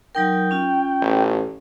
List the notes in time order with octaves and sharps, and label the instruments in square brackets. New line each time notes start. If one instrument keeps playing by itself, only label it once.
[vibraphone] F#3 D#4 A#4 [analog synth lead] G5
[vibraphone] C#4 F4
[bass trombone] A1